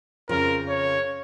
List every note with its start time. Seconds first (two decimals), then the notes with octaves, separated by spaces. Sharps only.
0.29 F2 C#3 F3 A#4
0.68 C#5